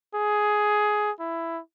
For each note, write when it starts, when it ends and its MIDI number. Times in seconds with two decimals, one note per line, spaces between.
0.15 1.11 68
1.20 1.60 64